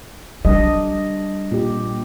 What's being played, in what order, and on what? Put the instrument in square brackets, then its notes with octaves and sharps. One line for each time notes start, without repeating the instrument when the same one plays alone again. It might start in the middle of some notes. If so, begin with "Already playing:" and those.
[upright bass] G3 [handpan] D4 D#5
[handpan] A#2 G4